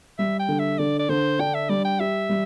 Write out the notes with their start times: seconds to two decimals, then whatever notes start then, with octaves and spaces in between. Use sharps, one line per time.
0.19 G3 E5
0.39 G5
0.49 D3
0.59 E5
0.78 D3 D5
0.99 D5
1.09 D3 C5
1.39 D4 G5
1.54 E5
1.69 G3 D5
1.85 G5
2.00 G4 E5
2.29 G3